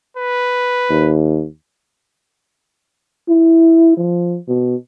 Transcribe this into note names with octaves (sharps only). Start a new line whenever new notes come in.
B4
D#2
E4
F3
B2